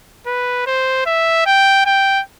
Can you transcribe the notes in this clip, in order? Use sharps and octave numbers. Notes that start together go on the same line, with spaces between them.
B4
C5
E5
G5
G5